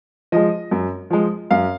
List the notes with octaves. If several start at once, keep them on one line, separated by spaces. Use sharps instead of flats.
F3 G#3 D#5
F#2
F3 G#3
F#2 F5